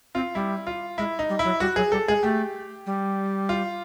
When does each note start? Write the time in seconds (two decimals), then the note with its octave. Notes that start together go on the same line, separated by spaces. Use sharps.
0.15 C4 F4
0.35 G3 E4
0.67 F4
0.98 G#3 E4
1.19 D#4
1.29 G3
1.39 E4
1.45 F#3
1.60 G3 F#4
1.76 F#3 G#4
1.92 G3 A4
2.08 G#3 G#4
2.23 A3 G4
2.86 G3
3.49 F4